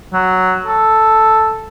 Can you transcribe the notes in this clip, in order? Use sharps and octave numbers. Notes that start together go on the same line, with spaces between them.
F#3
A4